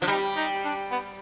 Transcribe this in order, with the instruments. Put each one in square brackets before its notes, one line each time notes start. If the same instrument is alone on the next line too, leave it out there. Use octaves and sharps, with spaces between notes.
[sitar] F3 [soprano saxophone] D4
[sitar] G3 [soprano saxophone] D#4
[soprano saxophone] D#4
D4
B3